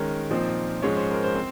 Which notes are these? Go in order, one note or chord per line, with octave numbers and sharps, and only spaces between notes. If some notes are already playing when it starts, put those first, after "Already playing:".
Already playing: D#3 G#3 C#4 A#4
A#2 F3 C4 D#4
G#2 F3 G#3 C#4 C#5
C5
A#4
C5
C4